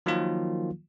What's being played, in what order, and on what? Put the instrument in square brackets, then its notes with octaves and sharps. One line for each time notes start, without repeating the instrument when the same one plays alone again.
[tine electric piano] D#3 F3 F#3 A#3 F4